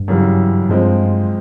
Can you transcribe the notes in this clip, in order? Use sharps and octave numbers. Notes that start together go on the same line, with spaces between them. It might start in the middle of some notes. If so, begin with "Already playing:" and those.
Already playing: G2
F#2 C#3 E3 G3
G2 F3 G#3 C4